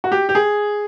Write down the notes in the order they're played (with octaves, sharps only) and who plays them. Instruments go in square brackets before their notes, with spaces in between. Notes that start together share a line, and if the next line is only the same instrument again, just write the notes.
[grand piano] F#4
G4
G4
G#4